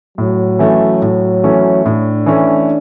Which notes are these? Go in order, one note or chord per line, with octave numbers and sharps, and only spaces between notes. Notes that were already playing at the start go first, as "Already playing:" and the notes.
A2 F#3
E3 A3 C#4
A2
E3 A3 C#4
A2 D4
E3 A3 C#4